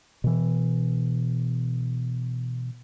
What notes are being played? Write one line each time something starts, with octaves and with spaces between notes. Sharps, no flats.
B2 E3